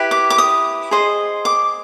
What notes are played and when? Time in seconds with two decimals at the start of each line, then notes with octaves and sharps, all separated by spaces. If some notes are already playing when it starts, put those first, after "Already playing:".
Already playing: E4 G4 B4
0.11 D6
0.30 D6
0.38 D#6
0.91 G#4 C5 D#5
1.45 D6